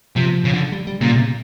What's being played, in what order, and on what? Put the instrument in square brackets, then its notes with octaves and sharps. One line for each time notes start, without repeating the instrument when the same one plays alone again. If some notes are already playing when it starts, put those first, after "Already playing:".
[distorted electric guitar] C3 [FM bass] F3
[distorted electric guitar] C#3
D3
[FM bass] G3
G3
[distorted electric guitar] A#2 [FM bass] C#3
[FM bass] C3